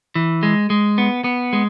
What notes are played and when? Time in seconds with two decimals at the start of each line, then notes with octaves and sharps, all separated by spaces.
0.15 E3
0.43 G#3
0.70 G#3
0.98 B3
1.24 B3
1.53 G#3